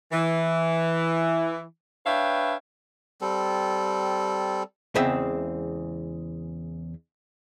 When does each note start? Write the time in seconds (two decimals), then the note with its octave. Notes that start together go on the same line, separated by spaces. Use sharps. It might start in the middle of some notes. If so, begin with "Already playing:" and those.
0.12 E3
2.05 D4 B4 C#5 E5 F5 G5
3.21 G3 C4 A4
4.95 E2 C#3 G#3 C4 E5